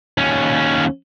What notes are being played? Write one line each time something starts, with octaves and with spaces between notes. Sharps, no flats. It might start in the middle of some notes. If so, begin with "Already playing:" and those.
D#2 C#4